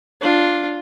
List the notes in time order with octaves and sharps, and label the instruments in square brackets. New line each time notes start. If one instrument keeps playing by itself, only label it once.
[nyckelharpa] D4 F4